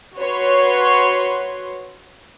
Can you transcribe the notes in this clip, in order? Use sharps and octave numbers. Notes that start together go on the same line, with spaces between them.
F#4 B4 C#5 C6